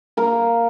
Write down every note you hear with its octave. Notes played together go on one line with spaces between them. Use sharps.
A#3 A#4